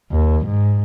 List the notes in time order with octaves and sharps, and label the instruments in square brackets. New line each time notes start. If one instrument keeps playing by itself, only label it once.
[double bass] D#2
G#2